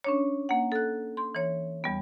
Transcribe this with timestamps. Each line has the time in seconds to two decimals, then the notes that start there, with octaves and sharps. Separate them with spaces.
0.04 C#4 D4 C#5
0.49 A#3 F#5
0.72 A4 F#6
1.17 C6
1.35 E3 C#5
1.84 E2 G3 B3